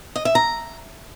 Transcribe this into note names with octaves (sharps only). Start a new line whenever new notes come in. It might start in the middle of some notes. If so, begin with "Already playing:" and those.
D#5
E5
A#5